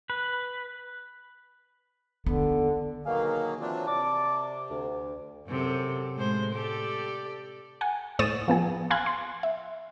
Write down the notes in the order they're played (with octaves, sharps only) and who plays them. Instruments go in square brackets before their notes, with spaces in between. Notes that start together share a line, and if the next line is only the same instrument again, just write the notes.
[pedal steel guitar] B4
[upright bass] D#2 B3 [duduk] D3
[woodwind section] B2 G#4 F5 [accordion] D#3 F#3 A#3
[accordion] E3 C4 D4 [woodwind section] F#3 F4
[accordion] C3 [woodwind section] D5 A5 D6
[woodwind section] D2
[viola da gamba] F#2 C3 A4
A2 G#3 C5
G4 A4 D5
[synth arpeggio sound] F#5 G#5
A2 C5 C#6 D#6 A6 E7
F3 B3 G#4
F5 G#5 B5 C6 F#6 G#6
C6
E5